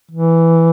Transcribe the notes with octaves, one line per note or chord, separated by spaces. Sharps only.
E3